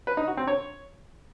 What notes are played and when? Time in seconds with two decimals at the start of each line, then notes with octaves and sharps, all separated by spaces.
0.07 B4
0.17 D#4
0.27 F#4
0.37 C4
0.47 C#5